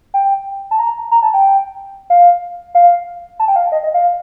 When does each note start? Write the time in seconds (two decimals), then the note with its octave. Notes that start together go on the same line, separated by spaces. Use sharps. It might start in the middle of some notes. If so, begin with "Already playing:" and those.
0.14 G5
0.71 A5
0.79 A#5
1.11 A#5
1.22 A5
1.34 G5
2.10 F5
2.75 F5
3.40 A5
3.48 G5
3.56 F5
3.72 D#5
3.83 D#5
3.94 F5